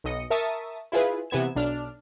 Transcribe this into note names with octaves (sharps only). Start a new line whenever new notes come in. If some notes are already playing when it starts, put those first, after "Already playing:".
B1 D#5 C#7
A#4 E5 A5 C#6 D#6 A6
E4 F4 G#4 B4
C3 E3 B3 G#6 E7
B1 D4 F6